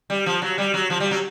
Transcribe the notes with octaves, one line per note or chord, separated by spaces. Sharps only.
G3
F3
F#3
G3
F#3
F3
G3
F#3